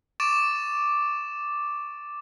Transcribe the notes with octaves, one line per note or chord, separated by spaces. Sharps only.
C#6 D6 A6 D7 E7